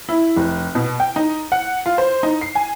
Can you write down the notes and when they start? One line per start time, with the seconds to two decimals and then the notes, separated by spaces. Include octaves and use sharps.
0.09 E4
0.37 F1
0.75 B2
1.00 G5
1.16 D#4
1.52 F#5
1.86 F4
1.98 C5
2.23 D#4
2.41 C7
2.55 G#5